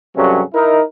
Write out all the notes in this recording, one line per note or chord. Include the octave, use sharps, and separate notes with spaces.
G2 C3 F#3 C#4 G#4 A4
D#4 E4 A#4